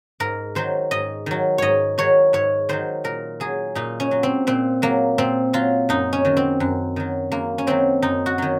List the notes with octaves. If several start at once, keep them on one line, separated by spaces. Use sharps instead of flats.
G#2 A#4
D#3 F#3 C5
G#2 D#5
D#3 F#3
G#2 C#5 D#5
D#3 F#3 C#5
G#2 C#5
D#3 F#3 C5
A#2 A#4
F#3 G#4
A#2 D#4
C#4
F#3
C4
A#2 C4
F#3 A#3
A#2 C4
F#3 F4
F#2 D#4
C#4
D#3 F#3
C4
F#2
D#3 F#3
F#2 A#3
C#4
D#3 F#3 C4
F#2 D#4
F#4
D#3 F#3